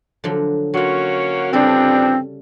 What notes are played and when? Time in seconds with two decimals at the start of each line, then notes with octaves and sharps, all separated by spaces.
0.24 D3 F3 F#3
0.74 F#3 A#3 C#4 F4 F#4
1.53 G2 C#3 F3 G3 C4 D4 A4